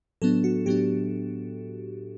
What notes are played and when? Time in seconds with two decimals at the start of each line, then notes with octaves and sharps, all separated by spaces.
0.22 A2 F#3 B3 D4 A4
0.44 F#4
0.66 A2 F#3 B3 D4 G4